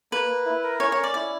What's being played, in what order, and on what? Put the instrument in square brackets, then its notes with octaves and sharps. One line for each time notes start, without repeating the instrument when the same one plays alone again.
[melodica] A#3 [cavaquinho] B4
[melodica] A#3
E4
A#4
[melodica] C#4 [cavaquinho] C#5
[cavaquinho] C#5
[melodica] C#4
[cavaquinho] D5
[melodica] E4 [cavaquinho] D5